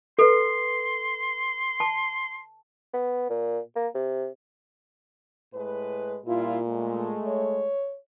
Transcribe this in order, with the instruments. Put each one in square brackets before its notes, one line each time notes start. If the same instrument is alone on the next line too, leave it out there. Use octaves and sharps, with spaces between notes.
[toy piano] A4 B4 [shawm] C6
[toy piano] A5
[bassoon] B3
A#2
A#3
C3
[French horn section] A2 G#3 B4
[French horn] A#2 [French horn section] G3 E4 F4
[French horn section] G#3 A3
[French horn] C#5